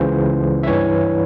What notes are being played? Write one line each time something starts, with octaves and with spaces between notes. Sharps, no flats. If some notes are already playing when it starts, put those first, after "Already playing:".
Already playing: C#2 C#3 E3 C5
E5
G2 E3 C#5